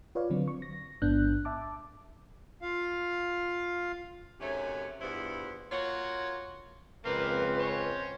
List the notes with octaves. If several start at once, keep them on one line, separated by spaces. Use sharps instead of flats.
F4 B4 C#5 D5 F5
D3 F#3 C4
C#6
A#6
A1 G#2 B3 D4 F#6 G6
E5 A5 D6
F4 F5
F#2 C3 A3 C#4 D#4 C#5
E2 G2 B3 E4 F4 C5
A#3 F4 F#4 C#5
C#2 A#3 C4 F4 B4 F6
C#4 C5 C#5